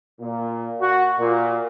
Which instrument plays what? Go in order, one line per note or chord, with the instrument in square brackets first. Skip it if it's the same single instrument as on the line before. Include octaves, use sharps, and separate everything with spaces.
[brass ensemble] A#2
F#4
A#2